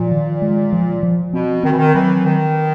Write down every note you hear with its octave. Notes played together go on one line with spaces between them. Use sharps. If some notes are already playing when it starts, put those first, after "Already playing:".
Already playing: A#2 F3
D#3
G#3
F3
F3
B2 C4
D#3 C4
E3
D#3
E3 F#3
D#3